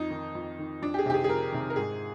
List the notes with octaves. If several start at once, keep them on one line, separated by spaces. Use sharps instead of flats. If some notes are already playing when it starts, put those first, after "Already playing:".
Already playing: F2 D#4
D#3
F2
D#3
F2 D4
G4
G#4
C3 D#3 G4
G#4
G#4
F2 A#4
C3 D#3
A#4
G#2 G#4